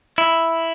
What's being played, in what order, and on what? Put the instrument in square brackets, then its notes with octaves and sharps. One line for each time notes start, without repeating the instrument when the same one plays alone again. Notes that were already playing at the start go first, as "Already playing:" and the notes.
[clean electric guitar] E4